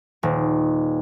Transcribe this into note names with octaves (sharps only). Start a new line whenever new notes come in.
D#1